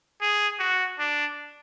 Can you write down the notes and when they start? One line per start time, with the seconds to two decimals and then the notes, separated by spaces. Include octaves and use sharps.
0.21 G#4
0.59 F#4
0.99 D4